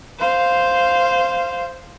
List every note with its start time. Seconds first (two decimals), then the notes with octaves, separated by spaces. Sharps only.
0.19 C5 F5